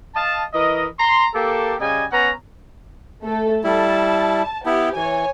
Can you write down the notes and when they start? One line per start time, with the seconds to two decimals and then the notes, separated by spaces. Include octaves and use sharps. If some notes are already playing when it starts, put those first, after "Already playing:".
0.16 D#5 F5 A5
0.54 E3 A#4 D#5
1.00 A#5 C6
1.35 A#3 G4 A4
1.80 C#3 G3 D#5 G#5
2.12 B3 C#4 F#5 A#5
3.24 A3 A4
3.64 G3 E4 A5
4.66 B3 E4 G4
4.96 E3 C#5 G#5